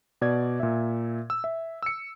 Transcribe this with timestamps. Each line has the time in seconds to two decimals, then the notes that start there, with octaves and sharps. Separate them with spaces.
0.21 B2 D5 G#6
0.60 A#2 E5
1.30 E6
1.44 E5
1.82 E6 C#7